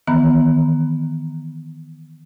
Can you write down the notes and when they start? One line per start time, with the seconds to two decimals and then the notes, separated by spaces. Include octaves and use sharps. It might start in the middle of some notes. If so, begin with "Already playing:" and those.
0.07 D#3 E3 B3 A#5